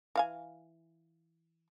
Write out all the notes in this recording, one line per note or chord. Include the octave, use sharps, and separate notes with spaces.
E3 F5 G#5